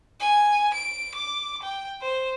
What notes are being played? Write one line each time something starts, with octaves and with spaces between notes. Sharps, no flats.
G#5
D7
D6
G5
C5